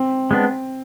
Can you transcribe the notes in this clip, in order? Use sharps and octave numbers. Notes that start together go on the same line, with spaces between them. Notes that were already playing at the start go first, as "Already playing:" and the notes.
Already playing: C4
G#3 B3 D4